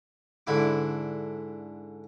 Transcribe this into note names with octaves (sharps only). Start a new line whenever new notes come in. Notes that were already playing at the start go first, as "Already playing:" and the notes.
G#2 D3 E4 D6